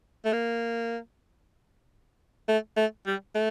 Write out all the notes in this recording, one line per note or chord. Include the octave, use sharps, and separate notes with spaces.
A3
A#3
A3
A3
G3
A3